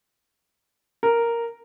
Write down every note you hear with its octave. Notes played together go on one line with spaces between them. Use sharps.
A#4